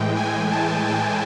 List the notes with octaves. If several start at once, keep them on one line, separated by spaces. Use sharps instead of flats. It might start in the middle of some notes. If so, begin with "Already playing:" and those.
Already playing: A2 E3 G#3 G5
G#5
A5
G5